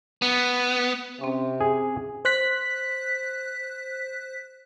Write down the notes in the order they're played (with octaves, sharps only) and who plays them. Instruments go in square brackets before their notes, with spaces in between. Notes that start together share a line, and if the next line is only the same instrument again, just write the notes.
[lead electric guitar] B3
[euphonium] C3 [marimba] C4 C#4
[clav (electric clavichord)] G#4
[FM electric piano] C5 F#6 B6